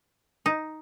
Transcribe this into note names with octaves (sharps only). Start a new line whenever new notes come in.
D#4